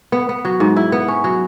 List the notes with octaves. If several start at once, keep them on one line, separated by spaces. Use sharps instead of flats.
B3
B3
F#3
G#2
E4
B3
C#4
F#3